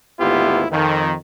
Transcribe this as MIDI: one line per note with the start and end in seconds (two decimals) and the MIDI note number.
0.20 0.65 32
0.20 0.65 38
0.20 0.65 59
0.20 0.65 64
0.20 0.65 65
0.20 0.65 67
0.71 1.15 41
0.71 1.15 51